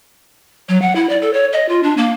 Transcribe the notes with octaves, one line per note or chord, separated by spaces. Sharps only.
F#3
F#5
E4
D5
A4
C#5
D#5
F4
D4
A#3